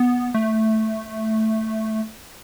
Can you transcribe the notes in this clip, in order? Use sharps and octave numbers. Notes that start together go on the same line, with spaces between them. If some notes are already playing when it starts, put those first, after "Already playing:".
Already playing: B3
A3